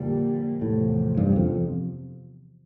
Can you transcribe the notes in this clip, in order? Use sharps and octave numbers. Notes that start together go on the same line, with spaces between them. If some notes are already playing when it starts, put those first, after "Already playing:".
Already playing: F2 A#2 D3 G3
E2 A2 C3 F3
G2
F2